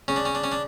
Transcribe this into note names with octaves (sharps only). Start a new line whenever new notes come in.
C#3 C#4
D4
C#4
D4
C#4
D4